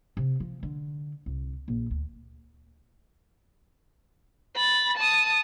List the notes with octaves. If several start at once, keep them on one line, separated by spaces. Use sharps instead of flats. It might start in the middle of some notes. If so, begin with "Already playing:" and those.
C3
F3
D3
C2
A#1
D2
B5 A6
A5 D#6